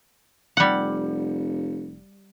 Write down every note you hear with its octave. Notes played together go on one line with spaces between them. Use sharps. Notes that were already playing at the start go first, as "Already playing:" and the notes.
F1 G3 F#5